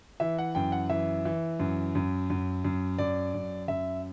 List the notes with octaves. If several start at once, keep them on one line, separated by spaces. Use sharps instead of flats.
E3 E5
F#5
F#2 G5
F#5
E3 E5
E3
F#2
F#2
F#2
F#2
F#2 D5
F#2
F#2 E5